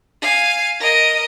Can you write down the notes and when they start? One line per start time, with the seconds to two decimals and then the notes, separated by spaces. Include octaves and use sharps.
0.22 F5 G#5
0.80 A#4 D#5